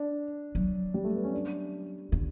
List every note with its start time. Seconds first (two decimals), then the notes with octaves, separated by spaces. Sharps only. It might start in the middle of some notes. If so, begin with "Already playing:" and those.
Already playing: D4
0.55 F#3
0.94 G3
1.04 A3
1.14 B3
1.24 C#4
1.34 D4
2.12 D3